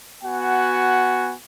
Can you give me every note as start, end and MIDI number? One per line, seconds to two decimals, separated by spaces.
0.23 1.34 59
0.23 1.34 66
0.23 1.34 78
0.23 1.34 80